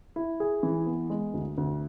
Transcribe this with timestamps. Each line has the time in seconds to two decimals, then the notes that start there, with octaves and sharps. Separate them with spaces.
0.16 E4
0.40 G#4
0.63 E3
0.86 B3
1.10 G#3
1.34 D2
1.57 D2